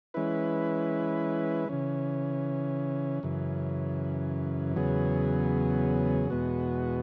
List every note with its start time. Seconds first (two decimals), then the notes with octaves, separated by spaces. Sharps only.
0.14 E3 G#3 C#4 E4 B4
1.69 C#3 E3 C#4
3.23 F#2 C#3 E3
4.76 E2 C#3 F#3 B3 G#4
6.30 E2 B2 G#3 B3 F#4